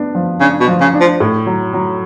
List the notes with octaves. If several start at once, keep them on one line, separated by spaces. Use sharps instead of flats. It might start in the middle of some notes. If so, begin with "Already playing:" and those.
Already playing: B3 D4
F3
C#3 D4
B2
F3
C#3
D4
F3
A2
F#3
F#3